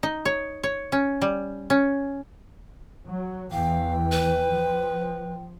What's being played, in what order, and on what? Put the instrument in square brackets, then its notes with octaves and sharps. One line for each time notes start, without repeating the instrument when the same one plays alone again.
[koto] D#4
C#5
C#5
C#4
G3
C#4
[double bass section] F#3
[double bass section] E2 E3 [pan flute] F5 [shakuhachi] G5
[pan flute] B4
[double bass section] F3